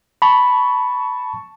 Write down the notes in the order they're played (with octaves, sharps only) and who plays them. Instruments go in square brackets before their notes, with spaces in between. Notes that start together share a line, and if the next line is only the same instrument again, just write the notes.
[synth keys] A5 C#6 [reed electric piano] B5